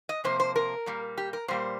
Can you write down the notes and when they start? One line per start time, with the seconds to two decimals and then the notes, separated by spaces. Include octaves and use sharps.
0.09 D#5
0.24 C3 F3 A#3 C5
0.40 C5
0.56 A#4
0.86 A#2 G3 A#3
1.18 G4
1.33 A#4
1.48 A#2 G3 A#3 C5